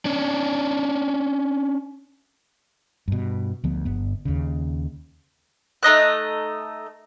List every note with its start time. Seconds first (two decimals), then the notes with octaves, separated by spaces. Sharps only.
0.05 C#4 D4
3.08 G2 B2
3.64 D2 F3 B3
3.85 G1 G2 B3
4.25 D#2 C#3
5.83 A3 D#4 D#5 F#6